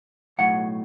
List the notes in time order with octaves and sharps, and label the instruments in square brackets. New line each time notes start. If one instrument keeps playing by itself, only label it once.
[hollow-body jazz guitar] B1 A2 F#3 F#5